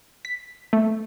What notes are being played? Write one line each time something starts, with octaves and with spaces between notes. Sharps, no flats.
B6
A3